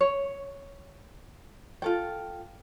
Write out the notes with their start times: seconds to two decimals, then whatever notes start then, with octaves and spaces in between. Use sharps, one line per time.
0.01 C#5
1.82 F4 A4 G5